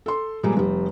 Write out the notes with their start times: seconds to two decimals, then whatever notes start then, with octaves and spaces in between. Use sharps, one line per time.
0.06 A4 C6
0.43 A#2 F3 G3 G#3 A#3
0.57 F1 G3